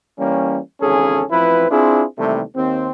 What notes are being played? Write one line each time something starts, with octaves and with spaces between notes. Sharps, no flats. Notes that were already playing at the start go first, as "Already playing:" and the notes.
E3 G3 A#3 C#4
G#1 E2 C#3 C#4 G#4 A4
A1 F3 C4 E4 B4
C4 D4 E4 F4 G#4
D#2 C3 E3 G3 A3
D#2 C4